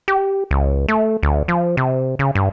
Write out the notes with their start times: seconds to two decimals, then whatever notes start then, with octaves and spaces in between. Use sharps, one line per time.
0.08 G4
0.51 C#2
0.88 A3
1.23 D2
1.48 F3
1.77 C3
2.19 C#3
2.35 G2